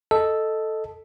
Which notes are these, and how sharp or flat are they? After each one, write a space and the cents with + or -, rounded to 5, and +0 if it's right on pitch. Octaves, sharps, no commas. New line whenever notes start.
A4 +0 D#5 +0